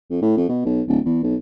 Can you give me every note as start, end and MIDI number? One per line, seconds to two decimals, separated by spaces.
0.10 0.21 41
0.22 0.36 45
0.37 0.48 41
0.49 0.64 47
0.65 0.82 35
0.88 0.99 26
1.05 1.22 40
1.23 1.36 35